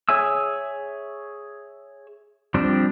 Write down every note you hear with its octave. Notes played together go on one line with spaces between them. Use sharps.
G#4 C#5 E5 G#5 E6
F3 G3 C4 D4 G4